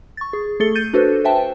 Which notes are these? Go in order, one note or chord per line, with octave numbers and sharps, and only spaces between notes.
C#6 A6
G#4
A3 G#4 A4 A6 C#7 G7
G6 A6 D#7
D4 F#4 A4 B4 C5
B4 C5 E5 G5 A5